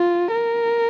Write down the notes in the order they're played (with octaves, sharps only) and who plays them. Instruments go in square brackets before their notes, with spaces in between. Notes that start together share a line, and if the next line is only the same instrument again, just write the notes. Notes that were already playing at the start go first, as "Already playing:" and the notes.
Already playing: [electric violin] F4
A#4